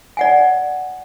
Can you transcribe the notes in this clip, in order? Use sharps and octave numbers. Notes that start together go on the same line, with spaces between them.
D5 F#5 G#5